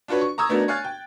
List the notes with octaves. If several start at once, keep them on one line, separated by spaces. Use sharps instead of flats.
D4 F4 F#4 B4 C#5
C#6
A#5 C#6 D#6 E6 G#6
A3 B3 D4 D#4 F#4 A#4
C#5 F5 G#5 F6 F#6 A6
G5